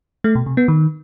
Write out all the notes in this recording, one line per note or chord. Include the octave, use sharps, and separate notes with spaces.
A3
B2
C3
B3
D#3